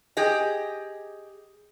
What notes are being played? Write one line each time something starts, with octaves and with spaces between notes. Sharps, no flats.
G4 G#4 D#5